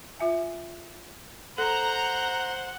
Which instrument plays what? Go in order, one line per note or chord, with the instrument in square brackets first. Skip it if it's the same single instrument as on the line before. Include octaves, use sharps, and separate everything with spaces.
[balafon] F4 E5 G#5
[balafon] A4 [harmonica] C5 [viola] F#5 [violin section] A#5